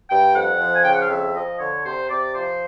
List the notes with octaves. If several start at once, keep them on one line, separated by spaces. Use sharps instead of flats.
G2 G5
F2 F#5
F3
G#5
C#3 G5
F#5
F5
F2 E5
F3 D#5
D3 C#5
C3 C5
C3 D5
F3 C5